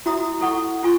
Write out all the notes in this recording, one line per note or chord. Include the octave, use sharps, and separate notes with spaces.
E4 F#4 E5 A#5 D#6
E4 A4 F#5 C#6
E4 F4 G#5 C#6